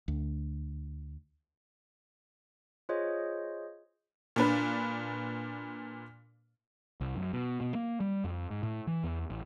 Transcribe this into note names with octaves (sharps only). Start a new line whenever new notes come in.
D2
F4 G#4 C5 C#5 D#5
A#2 D4 B4
C2
F#2
B2
B2
A#3
G3
F2
G#2
A2
E3
E2
A1